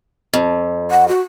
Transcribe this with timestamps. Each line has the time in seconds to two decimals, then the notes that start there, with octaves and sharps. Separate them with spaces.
0.33 F2
0.91 F#5
1.08 F#4